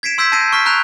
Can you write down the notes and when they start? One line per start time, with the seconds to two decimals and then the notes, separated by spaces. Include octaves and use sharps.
0.03 G#6 B6 C7 D7 E7
0.18 C6 E6 G6 G#6 B6
0.32 A5 G6 A#6 C7 D#7
0.52 C#6 F6 B6 C7
0.66 A#5 F#6 G6 B6 D7 F7